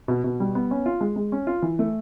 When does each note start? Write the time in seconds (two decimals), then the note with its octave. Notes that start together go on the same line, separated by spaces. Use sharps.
0.08 B2
0.24 B2
0.40 G3
0.55 B3
0.71 C#4
0.86 F4
1.01 G#3
1.16 G#3
1.32 C#4
1.47 F4
1.62 E3
1.79 A3